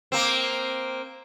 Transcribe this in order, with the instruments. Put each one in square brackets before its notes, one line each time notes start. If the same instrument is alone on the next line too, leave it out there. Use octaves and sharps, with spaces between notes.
[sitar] A#3 C4